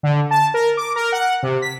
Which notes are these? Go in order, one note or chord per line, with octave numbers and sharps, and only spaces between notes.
D3
A5
A#4
D6
A#4
F#5
C3
B6